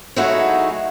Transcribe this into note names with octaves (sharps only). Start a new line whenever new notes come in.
F#3 G#3 A3 D#4 E4 F#4